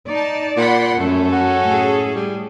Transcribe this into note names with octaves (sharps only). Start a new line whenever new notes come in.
D#4 D5 A5
A#2 F#5 B5 C6
F#2 A3 C#4 A4
F#4
A2 G#4
G3